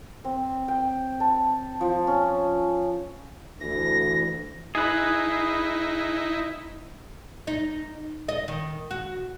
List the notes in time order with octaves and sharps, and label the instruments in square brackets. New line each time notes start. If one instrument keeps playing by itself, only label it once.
[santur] C4
G5
A5
F3
C#4
[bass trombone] D2 [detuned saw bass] E3 [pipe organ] A#6
[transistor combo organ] D#4 E4 [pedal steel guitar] G#4 B4
[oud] D#4
D#5
D#3
F#4